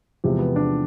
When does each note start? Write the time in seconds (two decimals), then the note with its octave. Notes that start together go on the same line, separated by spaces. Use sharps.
0.24 E2 C3 F3 G#3
0.39 B3
0.56 D4